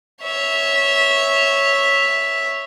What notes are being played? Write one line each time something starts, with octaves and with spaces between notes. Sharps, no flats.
C#5 E5